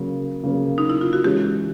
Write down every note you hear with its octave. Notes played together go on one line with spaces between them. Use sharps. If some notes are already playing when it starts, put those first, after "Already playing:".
Already playing: C#3 F#3 A#3
C#3 F#3 A#3
D#4
E4
F4
F#4
E3 G#3 C#4 G4